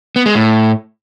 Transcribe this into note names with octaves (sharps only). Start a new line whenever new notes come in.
B3
G#3
A2